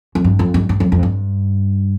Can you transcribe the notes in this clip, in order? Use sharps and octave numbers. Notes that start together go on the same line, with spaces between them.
F2
G2
F2
G2
G2
F2
F2
G2